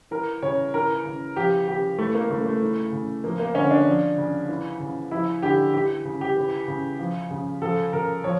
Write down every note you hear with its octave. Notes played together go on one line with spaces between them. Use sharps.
E3 A#4
C#3 C#5
E3 A#4
C#3
F3 G4
C#3 G4
E3 A3
A#3
C#3 A3
A3
E3
C#3
F3 A#3
A#3
D3 C#4
D4
F3
C#3
E3
C#3
F3 E4
D3 G4
E3 G4
C#3
G4
E3
C#3
F3
C#3
F3 A4
C#3 A#4
F3 C#5